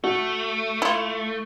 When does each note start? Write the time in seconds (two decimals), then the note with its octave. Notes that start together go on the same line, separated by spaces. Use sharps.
0.04 A3 F#4
0.82 E4 F4